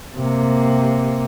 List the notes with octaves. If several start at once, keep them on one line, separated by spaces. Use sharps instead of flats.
C3 A#3